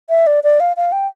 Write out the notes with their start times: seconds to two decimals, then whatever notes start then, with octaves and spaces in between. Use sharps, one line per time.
0.10 E5
0.27 D5
0.44 D5
0.60 F5
0.77 F5
0.92 G5